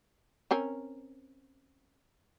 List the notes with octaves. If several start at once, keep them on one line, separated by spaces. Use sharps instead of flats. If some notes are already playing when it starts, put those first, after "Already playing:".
C4 C#4 A#4